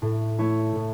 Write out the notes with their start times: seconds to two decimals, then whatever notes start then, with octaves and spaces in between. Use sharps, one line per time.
0.02 A2
0.38 A3 E4 C#5
0.76 A2